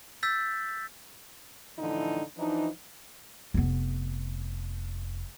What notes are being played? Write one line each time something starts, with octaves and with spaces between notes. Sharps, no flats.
E6 G6 A6 B6
A2 D3 E3 F3 D#4 E4
E3 F3 D4 D#4
F1 B3